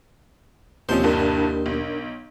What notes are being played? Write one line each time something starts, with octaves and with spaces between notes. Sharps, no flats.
D#2 C3 F3 C#4 C5
C2 G2 D4 A#4
B1